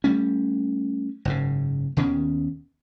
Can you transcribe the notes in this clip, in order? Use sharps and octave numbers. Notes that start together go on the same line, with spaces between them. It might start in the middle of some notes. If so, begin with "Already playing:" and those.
G3 A3 C#4
F#1 G#2 C#3
D#2 B2 D#3 C#4